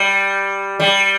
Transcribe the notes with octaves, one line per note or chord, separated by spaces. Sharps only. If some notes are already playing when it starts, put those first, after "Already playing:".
Already playing: G3
G3